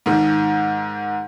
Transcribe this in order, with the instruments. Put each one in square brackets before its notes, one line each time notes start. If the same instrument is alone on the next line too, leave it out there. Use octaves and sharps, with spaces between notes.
[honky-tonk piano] G#2 D#3